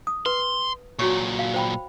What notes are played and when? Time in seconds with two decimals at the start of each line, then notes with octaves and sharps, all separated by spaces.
0.07 D#6
0.26 B4 C6
0.99 A#2 F#3 F#4 C#5 C#6
1.39 F5
1.54 C5 G5 B5